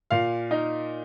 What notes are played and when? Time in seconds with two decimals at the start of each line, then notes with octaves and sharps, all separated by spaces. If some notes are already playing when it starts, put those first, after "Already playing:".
0.10 A#2 F5
0.51 D#4